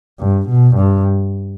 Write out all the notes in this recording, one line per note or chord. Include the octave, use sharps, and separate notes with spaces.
G2
B2
G2